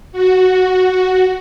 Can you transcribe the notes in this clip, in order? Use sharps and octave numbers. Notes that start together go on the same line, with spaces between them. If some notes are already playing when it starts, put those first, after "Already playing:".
F#4